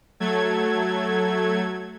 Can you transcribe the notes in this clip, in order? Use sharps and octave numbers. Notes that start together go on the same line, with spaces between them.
F#3 A3 A4 G#6